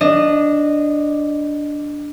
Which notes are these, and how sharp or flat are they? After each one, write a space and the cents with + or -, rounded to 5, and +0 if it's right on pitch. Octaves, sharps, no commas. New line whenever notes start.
D4 +0 D#5 -15